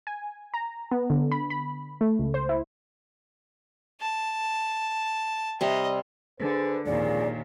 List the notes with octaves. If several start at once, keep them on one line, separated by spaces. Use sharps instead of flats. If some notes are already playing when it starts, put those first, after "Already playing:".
G#5
A#5
B3
D3
B5
B5
A3
C#2
C5
E4
A5
C3 G3 C4 D#5
D3 G#4 B4 C5
G#1 D#2 A#2 F3 G#4 D5